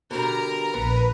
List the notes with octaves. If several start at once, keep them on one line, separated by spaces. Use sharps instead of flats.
B2 D3 G3 A#4 A#5
A#1 B3 B4